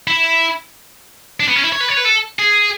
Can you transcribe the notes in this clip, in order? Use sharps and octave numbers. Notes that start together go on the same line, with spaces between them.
E4
D4
B3
C#4
E4
C#5
B4
C#5
B4
A4
G#4